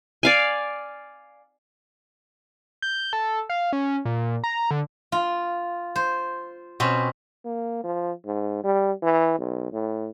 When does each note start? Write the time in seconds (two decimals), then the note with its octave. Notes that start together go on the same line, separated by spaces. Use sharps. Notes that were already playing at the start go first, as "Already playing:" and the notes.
0.23 D5 F5 G#5
2.82 G6
3.13 A4
3.50 F5
3.73 C#4
4.05 A#2
4.44 A#5
4.71 D3
5.12 F4
5.96 C5
6.80 B2 C4 C#4
7.45 A#3
7.84 F3
8.26 G#2
8.64 G3
9.03 E3
9.39 B1
9.73 A2